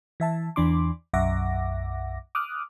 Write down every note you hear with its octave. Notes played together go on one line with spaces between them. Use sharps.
E3 E5 A5
E2 E3 D4 C6 D6
B1 F#2 E5 F#5 D6 A#6
D6 D#6 F6 F#6